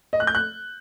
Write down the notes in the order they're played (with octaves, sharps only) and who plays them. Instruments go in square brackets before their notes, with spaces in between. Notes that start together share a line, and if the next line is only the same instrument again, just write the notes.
[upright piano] D#5
F#6
G6
F#6